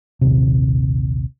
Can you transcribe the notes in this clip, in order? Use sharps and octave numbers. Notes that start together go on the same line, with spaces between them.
A#1 D#2 C3